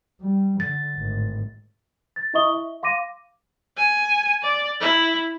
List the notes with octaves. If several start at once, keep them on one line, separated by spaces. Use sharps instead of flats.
G3
D3 A6
G#1 A2
A6
E4 D#5 E5 C#6 D#6 G7
E5
F5 C6 D6 A#6 D#7
G#5
D5
E4